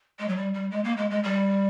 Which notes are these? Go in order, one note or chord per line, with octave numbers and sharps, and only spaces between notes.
G#3
F#3
G3
G3
G#3
A#3
G#3
G#3
G3